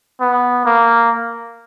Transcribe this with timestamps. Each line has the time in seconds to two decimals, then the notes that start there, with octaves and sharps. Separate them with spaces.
0.21 B3
0.65 A#3